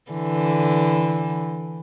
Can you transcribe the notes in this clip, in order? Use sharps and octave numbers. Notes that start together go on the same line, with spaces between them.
D3 E3